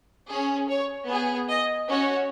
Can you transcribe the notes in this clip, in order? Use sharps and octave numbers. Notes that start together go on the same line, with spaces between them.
C#4 G#4
C#5
B3 G#4
D#5
C#4 F#4 C#5